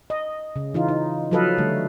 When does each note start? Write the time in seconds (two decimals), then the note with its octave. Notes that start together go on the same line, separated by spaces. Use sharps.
0.10 D#5
0.56 C#3
0.74 E3 D#4 F4
0.88 D#4
1.31 F3 F#3 A4 B4 D#5 F5
1.58 D3 G3 A3